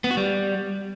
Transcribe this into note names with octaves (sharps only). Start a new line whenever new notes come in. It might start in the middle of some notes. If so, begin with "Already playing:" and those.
B3
F#4
G3